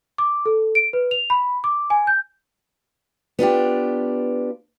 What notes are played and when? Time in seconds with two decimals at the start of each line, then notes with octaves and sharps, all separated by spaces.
0.18 D6
0.46 A4
0.75 D7
0.93 B4
1.11 F7
1.30 B5
1.64 D6
1.90 G#5
2.07 G6
3.39 B3 D4 F4 G4